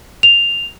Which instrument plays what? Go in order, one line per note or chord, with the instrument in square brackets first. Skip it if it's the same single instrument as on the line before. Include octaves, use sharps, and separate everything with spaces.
[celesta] F7